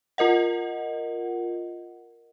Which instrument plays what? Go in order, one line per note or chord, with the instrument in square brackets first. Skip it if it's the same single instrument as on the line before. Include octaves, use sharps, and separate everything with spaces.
[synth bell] F4 A#4 D#5 F#5